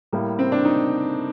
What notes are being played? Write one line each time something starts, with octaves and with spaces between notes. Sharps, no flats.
A2 G3 A#3
C4
D4
D#4